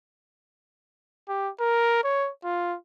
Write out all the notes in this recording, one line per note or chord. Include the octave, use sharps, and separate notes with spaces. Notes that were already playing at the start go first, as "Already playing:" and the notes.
G4
A#4
C#5
F4